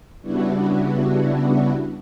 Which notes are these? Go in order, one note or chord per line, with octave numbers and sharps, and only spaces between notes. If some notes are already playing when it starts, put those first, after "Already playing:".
C#3 G3 B3 D4 E4 F#4